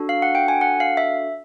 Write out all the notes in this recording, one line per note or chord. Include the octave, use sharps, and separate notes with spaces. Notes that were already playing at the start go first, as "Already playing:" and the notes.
Already playing: D4 F#4 A4
F5
F#5
G5
G#5
F#5
F5
E5